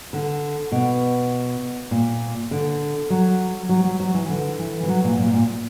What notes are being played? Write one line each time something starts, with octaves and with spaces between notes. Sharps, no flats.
D3
B2
A#2
D3
F#3
F#3
F#3
F#3
E3
D3
E3
E3
F#3
A#2
A#2
A#2